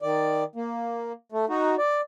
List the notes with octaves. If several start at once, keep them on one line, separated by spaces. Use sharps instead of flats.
D#3 D5
A#3
A3
D#4 F#4
D5